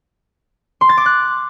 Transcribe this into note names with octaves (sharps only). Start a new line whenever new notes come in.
C6
A6
D6
F#6